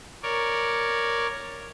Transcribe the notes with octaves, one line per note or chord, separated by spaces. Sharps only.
A#4 C#5 D5